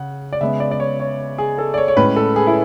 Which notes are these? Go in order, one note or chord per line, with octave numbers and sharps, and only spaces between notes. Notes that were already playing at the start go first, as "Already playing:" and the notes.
Already playing: C#3 F#5
D5
C#3 G#3 B3 E5
D5
D5
C#5
C#5
G#4
A4
D5
C#5
C#5
A2 G#3 C#4 B4
A4
G#4
E4